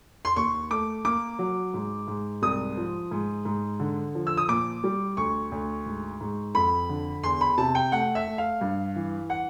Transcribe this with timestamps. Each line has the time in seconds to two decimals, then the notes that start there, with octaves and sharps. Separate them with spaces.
0.25 C6
0.36 D#2 C#6
0.70 A3 D6
1.05 A#3 D6
1.39 F#3
1.74 G#2
2.08 G#2
2.42 C2 D#6
2.77 F3
3.11 G#2
3.45 G#2
3.79 D3
4.15 F3
4.27 E6
4.37 D#6
4.49 A#2 D6
4.84 G3
5.17 D2 C#6
5.52 D2
5.86 G#2
6.21 G#2
6.55 F2 B5
6.89 D3
7.23 E2 C6
7.41 B5
7.58 C3 A5
7.75 G5
7.92 A3 F#5
8.15 E5
8.27 A3
8.38 F5
8.61 G2
8.96 E3
9.30 F#5